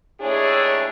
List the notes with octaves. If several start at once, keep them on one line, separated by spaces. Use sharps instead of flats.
D#2 A3 D4 E4 G#4 C#5